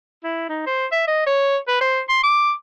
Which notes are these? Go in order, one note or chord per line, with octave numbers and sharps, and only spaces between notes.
E4
D#4
C5
E5
D#5
C#5
B4
C5
C6
D6